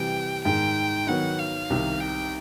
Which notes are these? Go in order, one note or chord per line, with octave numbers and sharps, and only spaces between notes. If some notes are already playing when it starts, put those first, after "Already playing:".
Already playing: C3 E3 G3 G5
G#2 D#3 G#3 G5
D#3 F#3 B3 F#5
F5
C2 C3 D#3
G5